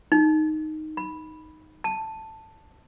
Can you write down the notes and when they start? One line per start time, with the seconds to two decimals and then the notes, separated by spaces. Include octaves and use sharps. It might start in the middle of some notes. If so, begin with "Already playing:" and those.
0.12 D#4
0.97 B5
1.84 A5